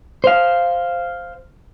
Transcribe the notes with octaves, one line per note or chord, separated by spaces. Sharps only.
C5 F5